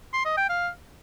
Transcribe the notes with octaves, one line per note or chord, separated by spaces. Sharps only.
C6
D#5
G5
F5